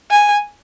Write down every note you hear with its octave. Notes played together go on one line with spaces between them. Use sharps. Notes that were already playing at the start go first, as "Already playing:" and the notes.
G#5